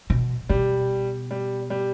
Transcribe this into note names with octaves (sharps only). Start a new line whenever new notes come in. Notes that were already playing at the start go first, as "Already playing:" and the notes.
B2
B2 G3
G3
G3